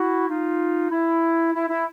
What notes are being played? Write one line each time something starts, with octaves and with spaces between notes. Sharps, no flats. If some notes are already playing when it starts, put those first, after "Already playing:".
Already playing: E4 F#4
D#4 F4
E4
E4
E4